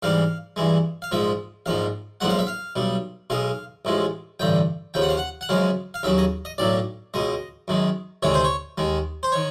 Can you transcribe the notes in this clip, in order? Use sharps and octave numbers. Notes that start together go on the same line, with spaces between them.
G#2 E3 G3 F5
G2 E3 G#3
F5
A#1 G#2 F3 G#3 E5
A#1 G#2 F3 F5
B1 A#2 F3 G#3 F#5
F5
E5
F5
B1 B2 G3
B1 B2 G#3 F5
A1 A2 F3 G#3
A1 G2 D3 G5
D#2 C#3 F3 G5
F#5
F5
F#5
F#5
F#2 C#3 F3 G#3 F5
F5
D#2 C#3 F#3 E5
D#5
D#5
B1 A2 F#3 D5
C#2 B2 G#3 D#5
F#2 D#3 G#3
D2 C3 D#3 G#3 C#5
C5
C#5
D#2 D#3 G#3
C5
D#3 C#5